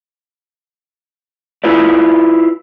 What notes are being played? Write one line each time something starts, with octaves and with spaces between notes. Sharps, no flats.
E4 F4 B4 D5